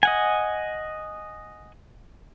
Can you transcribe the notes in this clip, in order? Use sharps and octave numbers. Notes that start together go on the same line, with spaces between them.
D#5 F#5 G#5